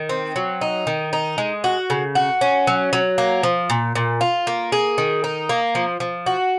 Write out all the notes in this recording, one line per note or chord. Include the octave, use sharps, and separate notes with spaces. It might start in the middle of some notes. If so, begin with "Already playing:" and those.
Already playing: D#3
C4
F#3
D#4
D#3
D#4
G#3
F#4
C#3
F#4
C#4
F#3
F#3
A#3
F3
A#2
A#2
F4
A#3
G#4
D#3
D#4
A#3
F3
F3
F#4